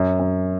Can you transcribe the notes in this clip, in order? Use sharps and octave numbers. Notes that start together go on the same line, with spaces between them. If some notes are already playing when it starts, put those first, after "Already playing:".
Already playing: F#2
F#2